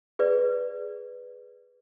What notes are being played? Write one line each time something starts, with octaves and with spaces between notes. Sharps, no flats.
G#4 B4 D5